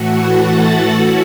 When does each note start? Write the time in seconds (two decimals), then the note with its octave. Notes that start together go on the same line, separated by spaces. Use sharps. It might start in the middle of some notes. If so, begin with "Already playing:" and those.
Already playing: A2 E3 A3 F#4 F#5
0.38 A4 A5
0.92 C#4 E4 F#4 F#5